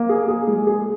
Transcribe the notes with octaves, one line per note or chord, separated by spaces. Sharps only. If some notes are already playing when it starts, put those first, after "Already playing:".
Already playing: A#3
G#4
G#4
G#3
G#4